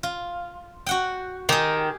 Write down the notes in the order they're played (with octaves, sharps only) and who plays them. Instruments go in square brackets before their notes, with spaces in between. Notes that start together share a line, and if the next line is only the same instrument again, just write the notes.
[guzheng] F4
F#4 F#5 G5
[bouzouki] D#3 [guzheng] G4 G#4